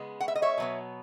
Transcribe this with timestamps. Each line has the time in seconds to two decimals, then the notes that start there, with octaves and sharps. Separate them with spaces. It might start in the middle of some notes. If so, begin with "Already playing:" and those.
Already playing: C#3 G#3 B3
0.21 F#5
0.28 E5
0.36 D#5
0.42 C#5 E5
0.58 B2 F#3 B3